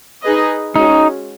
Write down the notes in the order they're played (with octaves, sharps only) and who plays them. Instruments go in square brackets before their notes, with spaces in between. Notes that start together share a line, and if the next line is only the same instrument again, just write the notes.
[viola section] D#4 G#4 B4 D#5
[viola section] G#3 C#4 F#4 [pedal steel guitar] D#4